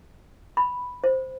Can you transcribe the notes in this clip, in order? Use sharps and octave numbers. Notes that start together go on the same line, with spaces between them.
B5
C5